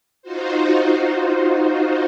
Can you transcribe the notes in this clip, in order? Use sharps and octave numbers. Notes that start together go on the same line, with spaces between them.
D#4 F4 F#4 C5